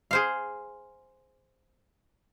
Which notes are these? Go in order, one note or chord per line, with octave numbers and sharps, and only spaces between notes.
G#4 C5 F5